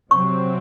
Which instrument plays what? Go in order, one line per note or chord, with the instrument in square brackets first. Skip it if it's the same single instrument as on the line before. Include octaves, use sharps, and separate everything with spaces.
[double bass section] C3 F#3 C4 [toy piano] C#6